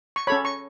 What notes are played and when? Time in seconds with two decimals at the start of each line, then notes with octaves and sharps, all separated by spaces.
0.16 C#6
0.27 C#4 A4 C#5 B5
0.45 C#6